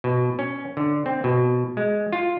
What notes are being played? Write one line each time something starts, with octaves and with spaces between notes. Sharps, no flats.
B2
C#4
D3
C4
B2
G#3
F4